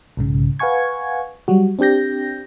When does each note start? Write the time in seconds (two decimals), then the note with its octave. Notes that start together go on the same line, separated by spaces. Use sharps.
0.17 B1 G#2 C#3
0.59 B4 F5 F#5 G#5 C#6 G#6
1.48 F#3 G3 F#4
1.79 C4 D4 G4 G6 A#6